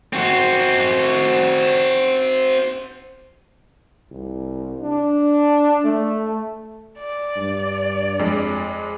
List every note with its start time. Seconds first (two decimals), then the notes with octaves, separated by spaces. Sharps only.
0.13 C4 F#4
4.11 C2
4.82 D4
5.84 A3
6.98 D5
7.36 G2
8.19 F2 G#3